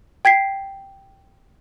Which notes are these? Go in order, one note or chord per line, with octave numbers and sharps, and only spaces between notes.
G5 G#6 B6 C7